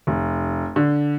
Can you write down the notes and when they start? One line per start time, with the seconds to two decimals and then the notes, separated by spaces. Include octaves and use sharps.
0.07 F1
0.76 D3